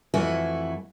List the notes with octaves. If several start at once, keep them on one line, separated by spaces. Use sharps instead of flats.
F2 E3 A3 E4 F#4 G#5